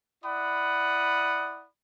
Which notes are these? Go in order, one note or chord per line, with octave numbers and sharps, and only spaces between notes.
E4 D5 F#5 B5 D#6